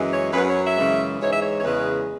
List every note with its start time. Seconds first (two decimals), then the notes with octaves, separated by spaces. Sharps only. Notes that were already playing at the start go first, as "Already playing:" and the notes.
Already playing: F#2 E3 G#3
0.12 C#5
0.33 F#2 F#3 B4
0.48 C#5
0.63 E5
0.76 F#2 C#3 E3 G#3
1.20 G#2 E3 G#3 C#5
1.29 E5
1.39 C#5
1.57 C#5
1.63 E2 C#3 G#3 B4